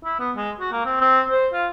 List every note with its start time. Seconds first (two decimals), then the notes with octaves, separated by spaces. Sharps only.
0.04 E4
0.20 B3
0.36 G#3
0.60 F#4
0.72 A#3
0.86 C4
1.01 C4
1.31 C5
1.53 F4